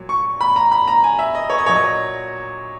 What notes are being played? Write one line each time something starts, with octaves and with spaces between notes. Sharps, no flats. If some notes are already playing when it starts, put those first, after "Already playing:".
Already playing: A#2 F#3
C#6
B5
A#5
B5
A#5
G#5
E5
D#5
C#5
D#5
A#2 F#3 C#5
D#5